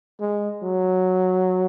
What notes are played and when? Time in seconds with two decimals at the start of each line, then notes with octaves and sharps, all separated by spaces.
0.20 G#3
0.63 F#3